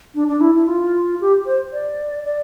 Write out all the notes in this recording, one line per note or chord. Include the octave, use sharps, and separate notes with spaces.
D4
D4
E4
E4
F4
G4
C5
D5
D5